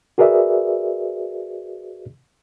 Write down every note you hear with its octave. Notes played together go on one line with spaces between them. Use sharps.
F#4 G#4 A#4 B4 D5 E5